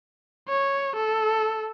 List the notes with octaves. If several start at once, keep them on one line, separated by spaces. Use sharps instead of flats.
C#5
A4